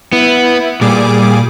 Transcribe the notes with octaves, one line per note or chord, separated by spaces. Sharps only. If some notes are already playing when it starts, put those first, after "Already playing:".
B3 E4
A#2 G3 G#4 D6